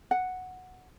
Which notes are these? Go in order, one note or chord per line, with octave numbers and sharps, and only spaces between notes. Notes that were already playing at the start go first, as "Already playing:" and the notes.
F#5